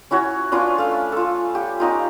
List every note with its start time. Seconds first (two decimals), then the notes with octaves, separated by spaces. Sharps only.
0.11 C#4 E4 F#4 C#5
0.52 C#4 D4 F4 B4
0.78 A3 F5 E6
1.12 F4 A4
1.55 G4
1.80 C#4 D#4 F4